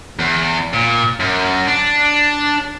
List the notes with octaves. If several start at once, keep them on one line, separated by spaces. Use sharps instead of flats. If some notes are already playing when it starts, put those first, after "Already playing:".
E2
A#2
F#2
D4